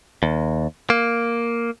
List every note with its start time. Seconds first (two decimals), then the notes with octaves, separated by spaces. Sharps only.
0.23 D#2
0.90 A#3